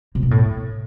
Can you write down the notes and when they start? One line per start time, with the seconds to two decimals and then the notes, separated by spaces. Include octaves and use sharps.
0.15 C3
0.23 B2
0.31 A2